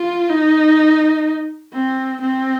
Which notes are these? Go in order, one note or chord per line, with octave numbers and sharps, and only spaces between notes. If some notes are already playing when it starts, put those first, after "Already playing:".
Already playing: F4
D#4
C4
C4